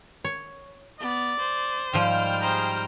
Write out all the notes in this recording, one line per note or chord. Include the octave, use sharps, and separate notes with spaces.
C#5
B3 D5
C5
G#2 F3 G3 G5 F6
G#4 C5 A#5